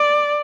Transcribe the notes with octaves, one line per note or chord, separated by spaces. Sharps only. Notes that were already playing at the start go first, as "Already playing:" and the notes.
Already playing: D5